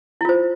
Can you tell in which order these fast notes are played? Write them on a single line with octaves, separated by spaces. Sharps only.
E4 F4 C5